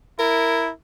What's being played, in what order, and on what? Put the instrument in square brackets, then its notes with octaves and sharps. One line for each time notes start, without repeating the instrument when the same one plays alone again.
[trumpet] E4 [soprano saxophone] A#4